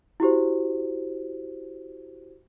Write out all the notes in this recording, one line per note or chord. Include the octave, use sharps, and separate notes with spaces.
E4 F#4 G4 C5